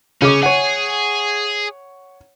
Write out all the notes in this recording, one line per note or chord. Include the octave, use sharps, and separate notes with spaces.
C#3 C#4 D6
G#4 C#5 F#5